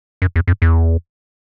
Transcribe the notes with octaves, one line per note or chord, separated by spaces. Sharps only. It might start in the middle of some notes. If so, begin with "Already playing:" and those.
F#2
E2
F2
E2